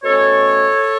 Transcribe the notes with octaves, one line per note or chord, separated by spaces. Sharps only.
B2 A3 C#4 A4 C#5